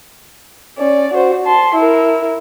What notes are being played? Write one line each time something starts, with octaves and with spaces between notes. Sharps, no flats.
C#4 D5
F#4 C5
A5 C6
E4 A#4